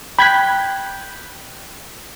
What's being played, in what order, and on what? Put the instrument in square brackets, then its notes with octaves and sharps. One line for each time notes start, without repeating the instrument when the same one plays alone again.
[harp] G5 F#6 [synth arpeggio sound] B5 G#6 B6